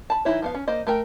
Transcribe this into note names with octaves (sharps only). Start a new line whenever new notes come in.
A5 B5
E3 A#3 D#4 E4 C#5
F3 B3 F5
C#4
A#3 C5 D#5
A3 A#4 G5